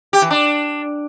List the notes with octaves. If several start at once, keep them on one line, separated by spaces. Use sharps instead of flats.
G4
E3
D4